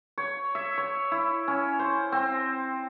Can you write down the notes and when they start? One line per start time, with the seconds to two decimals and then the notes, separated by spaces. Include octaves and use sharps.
0.18 C#5
0.55 E5
0.78 C#5
1.12 E4
1.48 C#4
1.79 C5
2.12 C4